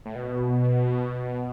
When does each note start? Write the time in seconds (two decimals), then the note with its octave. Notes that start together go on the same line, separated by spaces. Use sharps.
0.06 A2
0.15 B2